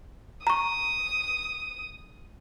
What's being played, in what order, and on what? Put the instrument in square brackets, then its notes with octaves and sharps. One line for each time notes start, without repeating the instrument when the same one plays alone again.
[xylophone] A#5 C#6 [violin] D#6